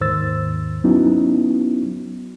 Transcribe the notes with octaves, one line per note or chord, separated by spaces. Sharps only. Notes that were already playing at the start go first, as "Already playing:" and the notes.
D#2 G#2 D#3 C5 E6 A6
F#3 B3 C#4 D#4 E4 F#4